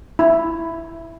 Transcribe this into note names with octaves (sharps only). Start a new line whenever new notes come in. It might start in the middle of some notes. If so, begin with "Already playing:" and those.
E4